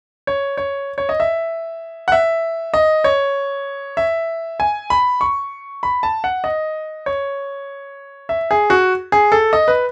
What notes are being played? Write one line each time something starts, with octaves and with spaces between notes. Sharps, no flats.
C#5
C#5
C#5
D#5
E5
F#5
E5
D#5
C#5
E5
G#5
B5
C#6
B5
A5
F#5
D#5
C#5
E5
G#4
F#4
G#4
A4
D#5
B4